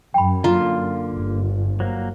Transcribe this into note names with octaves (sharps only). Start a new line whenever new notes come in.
F#2 G5 B5
D3 A#3 F4 A#5
G1
F#3 A#3 C5